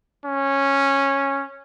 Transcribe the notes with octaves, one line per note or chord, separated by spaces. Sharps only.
C#4